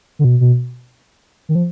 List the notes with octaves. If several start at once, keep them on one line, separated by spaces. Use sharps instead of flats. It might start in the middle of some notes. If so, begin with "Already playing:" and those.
D3
B2
B2
D#3
F3